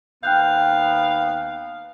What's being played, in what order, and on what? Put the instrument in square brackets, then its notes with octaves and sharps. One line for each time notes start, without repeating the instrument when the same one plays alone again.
[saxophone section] D#2 B3 F5 [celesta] G5 F#6 G6